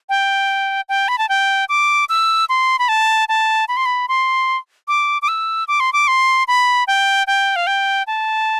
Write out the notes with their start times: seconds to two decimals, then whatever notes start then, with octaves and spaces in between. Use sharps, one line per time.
0.09 G5
0.89 G5
1.08 B5
1.18 A5
1.29 G5
1.69 D6
2.09 E6
2.49 C6
2.79 B5
2.89 A5
3.29 A5
3.68 B5
3.77 C6
3.86 B5
4.09 C6
4.88 D6
5.22 D6
5.28 E6
5.68 D6
5.80 C6
5.93 D6
6.08 C6
6.48 B5
6.87 G5
7.27 G5
7.56 F5
7.67 G5
8.07 A5